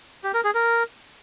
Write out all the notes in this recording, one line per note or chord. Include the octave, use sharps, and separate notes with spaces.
G4
A#4
G#4
A#4